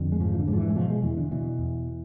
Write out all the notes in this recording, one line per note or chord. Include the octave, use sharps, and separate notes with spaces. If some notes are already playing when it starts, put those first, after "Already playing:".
Already playing: F2 D3
G#3
G#2 F3
E3
D3
G#2
F3
E3
G#3
B2 F3
G#3
E2 E3
D3
B2 E3
E2